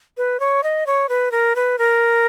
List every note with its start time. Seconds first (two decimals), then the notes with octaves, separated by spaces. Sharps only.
0.17 B4
0.40 C#5
0.63 D#5
0.87 C#5
1.09 B4
1.32 A#4
1.56 B4
1.78 A#4